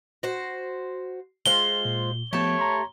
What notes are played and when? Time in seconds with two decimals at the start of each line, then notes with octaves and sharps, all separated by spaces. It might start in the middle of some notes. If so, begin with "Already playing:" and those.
0.23 F#4 C5
1.46 G#3 F4 C5 G7
1.85 A#2
2.33 F3 A3 B3 G4 C#5 A5
2.59 A#5 C6